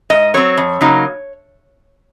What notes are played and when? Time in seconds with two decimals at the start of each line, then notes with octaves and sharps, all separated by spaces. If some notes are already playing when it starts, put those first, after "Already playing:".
0.10 G#2 D#5
0.34 F#3 C4 C#5
0.57 F2
0.81 C#3 F#3 A#3 D#4